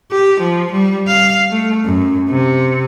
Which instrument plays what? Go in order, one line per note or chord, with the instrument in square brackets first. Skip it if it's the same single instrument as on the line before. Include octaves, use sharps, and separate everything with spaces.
[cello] G4
F3
G3
F5
A3
F#2
C3